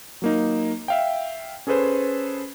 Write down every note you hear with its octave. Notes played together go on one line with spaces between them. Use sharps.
F#3 A#3 D#4
E5 F5 G5
C#4 G#4 A4 B4 C5